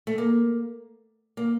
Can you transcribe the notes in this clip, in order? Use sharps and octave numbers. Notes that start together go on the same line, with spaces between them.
A3
A#3
A#3